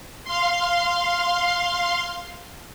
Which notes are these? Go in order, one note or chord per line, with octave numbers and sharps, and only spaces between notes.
F5 C6